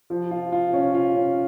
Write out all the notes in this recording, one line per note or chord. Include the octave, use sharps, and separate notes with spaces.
F3
F4
F4
C#4
F4
C#4